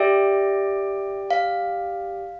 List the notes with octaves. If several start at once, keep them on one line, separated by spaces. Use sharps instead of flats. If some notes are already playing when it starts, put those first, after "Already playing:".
Already playing: G4 D5 E5 G5
F5